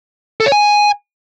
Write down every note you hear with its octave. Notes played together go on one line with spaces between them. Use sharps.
A4
C#5
G#5